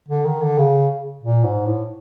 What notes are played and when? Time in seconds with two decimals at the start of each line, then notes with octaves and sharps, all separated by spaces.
0.09 D3
0.25 D#3
0.42 D3
0.58 C#3
1.23 A#2
1.44 G#2
1.66 A2